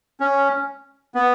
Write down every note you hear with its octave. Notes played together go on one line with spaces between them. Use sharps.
C#4
B3